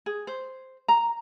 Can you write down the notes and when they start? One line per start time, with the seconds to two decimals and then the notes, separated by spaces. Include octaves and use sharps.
0.06 G#4
0.27 C5
0.88 A#5